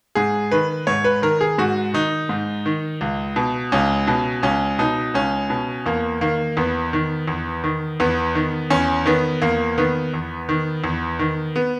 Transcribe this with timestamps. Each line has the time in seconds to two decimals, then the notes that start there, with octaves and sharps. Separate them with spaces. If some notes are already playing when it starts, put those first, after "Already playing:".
0.15 G#2 G#4
0.52 D#3 B4
0.87 G#2 C#5
1.04 B4
1.22 D#3 A#4
1.41 G#4
1.58 G#2 F#4
1.93 D#3 D#4
2.29 G#2
2.66 D#3
3.01 C#2
3.36 B2
3.72 C#2 C#4
4.07 B2
4.43 C#2 C#4
4.79 B2 D#4
5.14 C#2 C#4
5.50 B2
5.86 E2 A#3
6.21 D#3 A#3
6.57 E2 B3
6.93 D#3
7.28 E2
7.64 D#3
8.00 E2 B3
8.35 D#3
8.70 E2 C#4
9.06 D#3 B3
9.42 E2 A#3
9.78 D#3 B3
10.14 E2
10.49 D#3
10.84 E2
11.19 D#3
11.56 B3